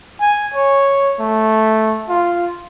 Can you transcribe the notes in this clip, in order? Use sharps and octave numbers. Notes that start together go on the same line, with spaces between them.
G#5
C#5
A3
F4